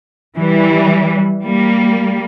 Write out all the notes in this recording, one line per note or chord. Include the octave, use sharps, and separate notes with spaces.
E3 G3
G3 A#3